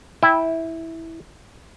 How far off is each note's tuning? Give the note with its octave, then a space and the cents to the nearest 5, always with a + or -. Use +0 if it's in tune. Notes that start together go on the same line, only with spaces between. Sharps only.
E4 -10 G5 +10